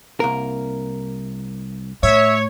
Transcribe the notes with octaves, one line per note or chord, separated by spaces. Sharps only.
C2 A#3 A#4
A2 C#5 E5